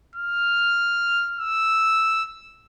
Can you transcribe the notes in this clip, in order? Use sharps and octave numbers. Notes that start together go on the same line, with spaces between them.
F6
E6